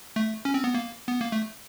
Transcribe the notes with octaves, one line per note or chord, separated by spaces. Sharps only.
A3
C#4
C4
B3
A#3
B3
A#3
A3